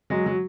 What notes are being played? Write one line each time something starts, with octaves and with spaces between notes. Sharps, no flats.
F#3 G#3
F#3